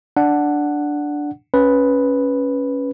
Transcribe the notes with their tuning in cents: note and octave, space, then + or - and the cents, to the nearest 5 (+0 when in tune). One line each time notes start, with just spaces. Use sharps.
D4 +0 F#5 +0
C#4 +0 B4 +0